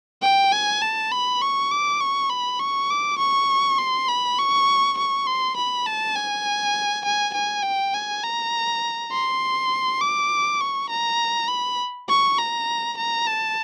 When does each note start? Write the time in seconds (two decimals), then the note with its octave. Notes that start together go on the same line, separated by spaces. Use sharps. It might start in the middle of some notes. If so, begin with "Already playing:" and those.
0.22 G5
0.52 G#5
0.81 A5
1.11 B5
1.41 C#6
1.71 D6
2.00 C#6
2.30 B5
2.59 C#6
2.90 D6
3.18 C#6
3.78 C6
4.09 B5
4.38 C#6
4.98 C#6
5.27 C6
5.57 B5
5.86 A5
6.16 G#5
7.05 G#5
7.34 G#5
7.63 G5
7.94 G#5
8.23 A#5
9.11 C6
10.00 D6
10.61 C#6
10.90 A#5
11.48 B5
12.09 C#6
12.38 A#5
12.97 A#5
13.27 A5